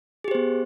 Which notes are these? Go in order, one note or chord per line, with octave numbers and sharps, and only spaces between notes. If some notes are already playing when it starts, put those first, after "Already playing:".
B3 G4 G#4 C5